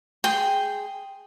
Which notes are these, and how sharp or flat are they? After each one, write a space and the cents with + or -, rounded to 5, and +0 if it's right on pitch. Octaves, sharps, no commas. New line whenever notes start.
G#4 +0 G5 +0 C6 +0